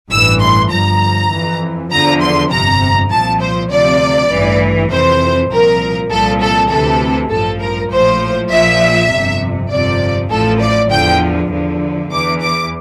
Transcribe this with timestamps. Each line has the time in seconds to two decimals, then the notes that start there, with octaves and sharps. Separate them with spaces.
0.11 A1 G2 E3 E6
0.40 C6
0.71 G1 G2 F3 A#5
1.30 F2 E3
1.90 E2 D3 F3 A#5
2.21 C6
2.51 G1 F2 C3 A#5
3.10 C2 A#2 F3 A5
3.41 C5
3.70 D2 C3 F3 D5
4.30 A1 G2 E3
4.91 F2 C3 E3 C5
5.50 C2 A#2 F3 A#4
6.10 C2 A#2 F3 A4
6.41 A4
6.70 D2 C3 E3 A4
7.30 A1 G2 F3 A4
7.60 A#4
7.91 A#1 A2 F3 C5
8.50 A#1 A#2 F3 E5
9.11 G1 F2 C3
9.70 G1 F2 C3 F3 D5
10.30 A1 A2 F3 A4
10.60 D5
10.90 E2 D3 F3 G5
11.50 E2 D3 F3
12.10 E2 E3 D6
12.40 D6